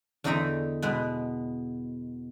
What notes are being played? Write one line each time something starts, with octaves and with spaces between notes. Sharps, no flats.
E2 D3 D#4 G#4 E5 A#5
B2 G#3 B3